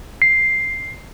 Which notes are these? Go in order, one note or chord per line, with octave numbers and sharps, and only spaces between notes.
C7